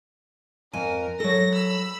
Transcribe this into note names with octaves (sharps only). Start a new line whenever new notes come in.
F2 A#4 G#5
F#3 A4 A#6
B5 E6